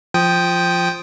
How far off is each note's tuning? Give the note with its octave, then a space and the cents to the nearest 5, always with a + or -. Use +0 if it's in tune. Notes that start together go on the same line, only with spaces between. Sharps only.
F3 +0 G5 +0 D#6 +0